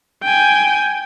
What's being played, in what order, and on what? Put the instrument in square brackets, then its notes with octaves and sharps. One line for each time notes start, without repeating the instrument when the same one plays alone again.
[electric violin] G5 G#5